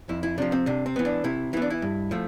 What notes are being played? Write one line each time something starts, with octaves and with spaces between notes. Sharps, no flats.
F2 E4
E4
C3 F3 D4
C4
C3 D4
C4
E3 B3
D4
C3 E4
E3 B3 E4
D4
E4
G2
F3 A3